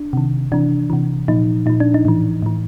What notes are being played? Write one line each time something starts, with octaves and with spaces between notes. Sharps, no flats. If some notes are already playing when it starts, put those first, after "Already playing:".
Already playing: D4
C3 D#3
C3 E3 D4
C3 E3
A#2 F3 D#4
A#2 F3 D#4
D4
D#4
A2 E3
A2 E3